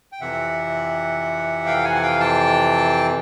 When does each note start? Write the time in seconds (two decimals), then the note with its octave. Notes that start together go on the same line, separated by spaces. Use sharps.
0.12 G5
0.20 F2 C3 E3 E5 F#5
1.66 F5 G5
1.84 F#5 G#5
1.95 F#5
2.02 F5 G5
2.20 G5 A5